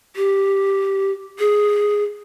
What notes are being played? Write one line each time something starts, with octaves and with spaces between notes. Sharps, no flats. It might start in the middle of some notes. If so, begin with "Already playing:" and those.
G4
G#4